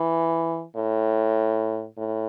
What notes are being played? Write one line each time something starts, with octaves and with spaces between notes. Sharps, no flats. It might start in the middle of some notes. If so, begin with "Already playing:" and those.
Already playing: E3
A2
A2